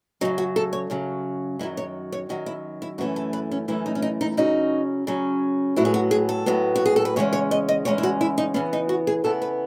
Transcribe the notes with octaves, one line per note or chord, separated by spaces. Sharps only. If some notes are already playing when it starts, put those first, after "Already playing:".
F#2 C#3 F#3 D#4
F#4
A4
C#5
F#2 C#3 F#3
F#2 D#3 F#3 E4
C#5
C#5
F#2 D#3 F#3 F#4
E4
E4
F#2 E3 A3 C#4 F#4
A4
B4
C#4
F#2 E3 A3 C#4 E4
D#4
C#4
D#4
D#4
C#3 F#3 C#4 D#4
C#3 F#3 C#4
A2 F#3 B3 E4
G#4
F#4
G#4
A4
A2 F#3 B3
F#4
G#4
A4
B4
E2 C#3 G#3 C#4 C#5
C#5
D#5
D#5
E2 C#3 G#3 C#4 C#5
E4
F#4
E4
D#4
C#3 E3 B3 C#4
D#4
F#4
G#4
C#3 E3 B3 A4
B4